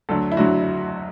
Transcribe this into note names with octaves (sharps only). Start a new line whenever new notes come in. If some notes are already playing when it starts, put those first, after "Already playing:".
D2 D3 F#3 A4
E4
D2 D3 F#3 F#4